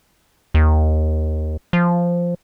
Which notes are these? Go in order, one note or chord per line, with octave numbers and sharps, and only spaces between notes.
D#2
F3